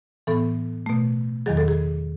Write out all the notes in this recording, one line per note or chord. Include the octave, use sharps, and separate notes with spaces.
A2 E3 B3 A4
B2 A3
E2 D#3 F#3 G#4
A4
G#4